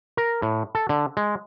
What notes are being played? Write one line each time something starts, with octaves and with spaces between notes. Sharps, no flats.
A#4
A2
A4
D3
G#3